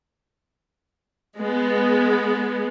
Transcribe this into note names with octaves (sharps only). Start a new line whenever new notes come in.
G#3 B3